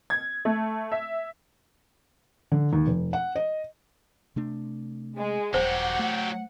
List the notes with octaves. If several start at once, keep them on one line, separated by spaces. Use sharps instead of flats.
G#6
A3
E5
D3
D#2
F1
F#5
D#5
C3 A3 D4
G#3
D#1 F#3 G4 C5 F#5
A3